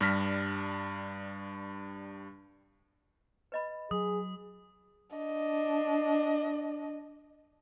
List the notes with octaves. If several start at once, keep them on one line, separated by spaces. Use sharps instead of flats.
G2 G3 D4 F6 A#6 B6
B4 D#5 B5
F#3 G#4 D#6
D4 D#5